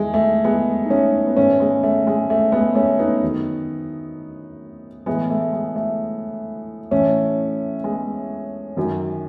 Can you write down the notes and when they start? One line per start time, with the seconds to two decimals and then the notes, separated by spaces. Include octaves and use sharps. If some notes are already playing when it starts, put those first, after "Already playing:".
Already playing: E2 D#3 G#3 A3
0.14 A3
0.44 G#3 B3
0.85 D#4
0.90 A3 C#4
1.27 B3
1.37 G#2 D#3 A3 C#4
1.60 G#3 B3
1.83 A3
2.07 G#3
2.30 A3
2.52 G#3 B3
2.75 A3 C#4
2.99 B3 D#4
3.22 F#2 D#3
5.06 A2 E3 G#3 B3
5.30 A3
5.53 G#3
5.76 A3
6.91 A2 E3 A3 C#4
7.84 G#3 B3
8.77 F#2 D#3